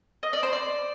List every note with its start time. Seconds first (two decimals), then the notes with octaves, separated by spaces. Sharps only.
0.23 D#5
0.33 D5
0.43 C5
0.53 D5